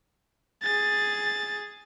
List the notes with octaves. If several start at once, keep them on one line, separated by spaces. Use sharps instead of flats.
G#4 A6